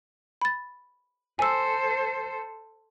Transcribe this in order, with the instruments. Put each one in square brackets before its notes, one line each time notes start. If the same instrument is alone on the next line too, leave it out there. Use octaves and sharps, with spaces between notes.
[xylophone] B5 A6
[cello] A4 C5 [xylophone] G#5 E6